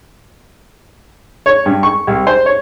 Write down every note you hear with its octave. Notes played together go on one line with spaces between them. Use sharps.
C#5
G2
C#6
C2
C5
C#5